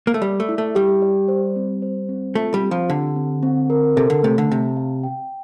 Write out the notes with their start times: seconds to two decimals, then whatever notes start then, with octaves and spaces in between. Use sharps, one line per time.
0.07 A#3
0.14 A3
0.22 G3 D5
0.40 A3
0.49 E4
0.58 A3
0.75 G3 G4
1.02 D5
1.28 C5
1.56 C4
1.82 C5
2.09 C4
2.35 A3 F4
2.54 G3
2.63 C4
2.71 F3
2.89 D3 G4
3.16 C4
3.43 C4
3.70 A#4
3.96 C3 A4
4.10 D3
4.23 C3 A3
4.38 D3
4.50 C3 A5
4.77 F5
5.03 G5